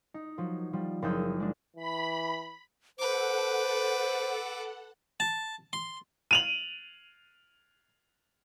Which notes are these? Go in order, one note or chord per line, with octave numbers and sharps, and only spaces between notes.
D#4
F3 F#3
F3 G3
F#1 F3 D#4 G#4 E6 G6
G#3 D4
E3 B5
A4 B4 C5 F#5 D6
A5
C6
D#7 F7 F#7